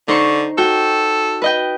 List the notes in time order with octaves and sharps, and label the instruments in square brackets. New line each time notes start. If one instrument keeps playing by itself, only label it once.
[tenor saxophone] D3 [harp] D#4 C5 C#6
[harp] F#4 G5 [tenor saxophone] A4
[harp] B4 D#5 G5